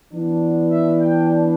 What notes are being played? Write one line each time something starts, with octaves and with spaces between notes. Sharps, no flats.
E3 B3 D4
E5
G5